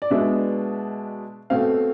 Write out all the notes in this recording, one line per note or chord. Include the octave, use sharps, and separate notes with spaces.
D5
B2 G#3 B3 D4 E5
B2 A3 C4 F5